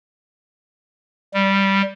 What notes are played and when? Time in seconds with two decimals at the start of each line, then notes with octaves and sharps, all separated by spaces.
1.34 G3